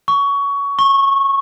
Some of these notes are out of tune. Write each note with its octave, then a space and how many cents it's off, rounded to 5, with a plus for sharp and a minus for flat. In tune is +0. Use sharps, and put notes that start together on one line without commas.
C#6 +20
C#6 -15